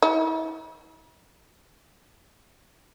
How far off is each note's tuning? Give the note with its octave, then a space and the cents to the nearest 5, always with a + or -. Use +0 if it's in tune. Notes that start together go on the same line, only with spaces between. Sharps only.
E4 -35